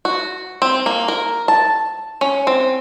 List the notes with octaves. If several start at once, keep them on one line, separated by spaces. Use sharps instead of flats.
F#4
C4
A#3
A#4
A5
C#4
C4